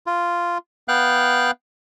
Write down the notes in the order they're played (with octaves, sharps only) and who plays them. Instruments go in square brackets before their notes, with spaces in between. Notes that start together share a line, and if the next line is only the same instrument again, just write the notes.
[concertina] F4
B3 F5 G5 F#6